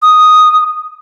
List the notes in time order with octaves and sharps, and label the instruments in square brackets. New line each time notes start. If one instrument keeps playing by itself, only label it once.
[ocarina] D#6